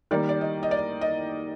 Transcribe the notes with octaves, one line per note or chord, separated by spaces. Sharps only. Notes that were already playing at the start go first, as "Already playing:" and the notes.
D#3 G3 A#3 D5
D5
D#5
D#5
D5
D#5